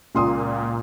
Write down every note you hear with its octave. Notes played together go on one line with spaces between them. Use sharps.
C#2 A#2 C6 D#6